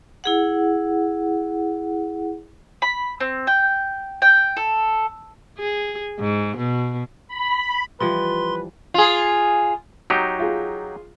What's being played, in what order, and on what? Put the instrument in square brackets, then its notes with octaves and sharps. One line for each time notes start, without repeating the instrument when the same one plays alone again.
[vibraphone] E4 G#4 F#5
[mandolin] B5
C4
G5
G5
A4
[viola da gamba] G#4
G#2
B2
[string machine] B5
[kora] E3 F3 G3 [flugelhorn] B4 [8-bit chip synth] C6
[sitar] F4 G#4
[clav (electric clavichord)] F#3 D#4 G4 [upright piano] C#6
[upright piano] F4 G#4